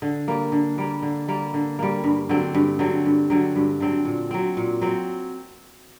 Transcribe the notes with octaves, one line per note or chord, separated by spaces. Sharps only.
D3
G3 A#3
D3
G3 A#3
D3
G3 A#3
D3
G3 A#3
G2
D3 F#3 C4
G2
D3 F#3 C4
G2
D3 F#3 C4
G2
D3 F#3 C4
A#2
F#3 C4
A#2
F#3 C4